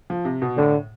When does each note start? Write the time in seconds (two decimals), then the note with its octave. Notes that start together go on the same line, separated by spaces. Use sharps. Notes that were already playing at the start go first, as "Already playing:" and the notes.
0.10 F3
0.25 C3
0.42 B2
0.57 A2 D3